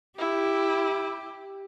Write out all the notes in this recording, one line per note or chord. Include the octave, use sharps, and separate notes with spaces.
E4 G4